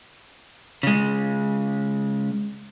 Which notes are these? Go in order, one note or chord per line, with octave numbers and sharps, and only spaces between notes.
C#3 G#3